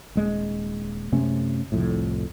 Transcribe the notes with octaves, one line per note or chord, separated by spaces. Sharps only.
D#1 G#3
F#2 C3 A3 C#4
C2 F2 A2